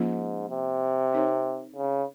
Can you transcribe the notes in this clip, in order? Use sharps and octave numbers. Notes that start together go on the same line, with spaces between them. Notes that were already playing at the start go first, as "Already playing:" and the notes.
Already playing: G#2 F3 A#3 C#4 F4
C3
C4 D#4 A#4 C#5
C#3